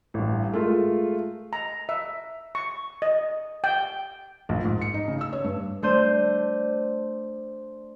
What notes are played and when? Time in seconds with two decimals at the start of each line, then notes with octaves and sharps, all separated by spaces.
0.14 A1 G2
0.52 G#3 A3 F4 A#4
1.53 A#5
1.89 E5
2.55 C#6
3.02 D#5
3.64 G5
4.49 A#1
4.64 G#2
4.81 C#7
4.94 D#4
5.08 C#3
5.21 E6
5.33 C#5
5.44 G2
5.82 A3 D4 C5 G6 D#7